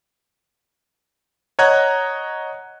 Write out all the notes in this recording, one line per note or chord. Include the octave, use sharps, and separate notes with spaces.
C#5 D#5 F#5 A#5 F#6 G#6